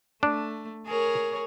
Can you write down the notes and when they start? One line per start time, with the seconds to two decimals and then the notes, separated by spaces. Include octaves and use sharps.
0.23 A3 D4
0.87 G#4 A#4 C#5